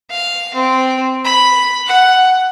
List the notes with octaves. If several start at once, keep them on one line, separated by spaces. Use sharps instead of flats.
F5
C4
B5
F#5